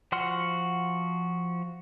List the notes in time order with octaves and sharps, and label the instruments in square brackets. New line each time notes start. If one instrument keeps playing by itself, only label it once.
[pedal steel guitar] F3 F#4 F#5 C6 F6